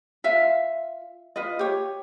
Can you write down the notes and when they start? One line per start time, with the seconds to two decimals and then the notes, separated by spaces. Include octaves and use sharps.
0.24 F4 E5 F5
1.36 F4 B4 D#5
1.59 G4 C#5